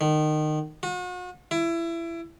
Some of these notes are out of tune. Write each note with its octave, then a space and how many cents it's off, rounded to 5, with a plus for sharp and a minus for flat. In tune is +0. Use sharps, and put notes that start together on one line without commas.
D#3 -25
F#4 -40
E4 +25